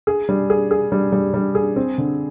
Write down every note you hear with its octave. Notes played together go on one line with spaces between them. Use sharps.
G#4
G3
G#4
G#4
G3
G3
G3
G#4
C4
D3